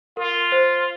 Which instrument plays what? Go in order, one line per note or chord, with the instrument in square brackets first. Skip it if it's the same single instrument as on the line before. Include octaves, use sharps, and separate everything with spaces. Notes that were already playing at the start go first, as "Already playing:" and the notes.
[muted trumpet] F4 [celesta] A#4
[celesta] C5